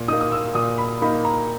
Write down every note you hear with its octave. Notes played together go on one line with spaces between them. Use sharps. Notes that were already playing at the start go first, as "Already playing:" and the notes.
Already playing: A#2
A#3 D#4 D#6
D#6
E6
A#2 D#6
B5
A#3 D#4 B5
A#5